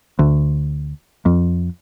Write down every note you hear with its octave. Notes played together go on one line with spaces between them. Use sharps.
D2
F2